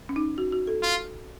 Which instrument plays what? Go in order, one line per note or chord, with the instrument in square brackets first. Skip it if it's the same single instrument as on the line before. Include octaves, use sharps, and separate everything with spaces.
[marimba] C#4
D#4
F#4
F#4
A4
[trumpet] F4